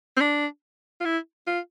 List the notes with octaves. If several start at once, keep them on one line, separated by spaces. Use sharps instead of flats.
C4
D4
F4
E4
F4